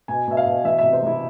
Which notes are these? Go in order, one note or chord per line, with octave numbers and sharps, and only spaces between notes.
B2 G#5
B2 E5
F5
B2
E3 E5
E5
C3
C5
C3 E4